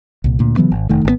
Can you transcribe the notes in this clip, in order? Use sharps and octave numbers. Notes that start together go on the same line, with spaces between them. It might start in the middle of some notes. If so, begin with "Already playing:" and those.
C2 A#2
D2 A#2
C#3 E3 F#3 B3
G#1
F1 D#3 A3
G#1 B2 B3